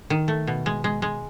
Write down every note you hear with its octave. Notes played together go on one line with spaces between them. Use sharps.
D#3
A3
B2
G#3
G#3
G#3